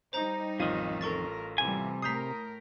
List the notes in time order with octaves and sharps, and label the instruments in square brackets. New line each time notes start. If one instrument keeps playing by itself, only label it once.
[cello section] G3 D#4 [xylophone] C5 A#5 G6
[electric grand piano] A1 F4 D#7 [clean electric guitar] F2 D#3
[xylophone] A4 C#6 A6 [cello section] A#4
[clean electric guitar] C3 G#5 [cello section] E3 G3
[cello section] A2 A#4 [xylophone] A#5 C7 [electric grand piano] D#6 G6 B6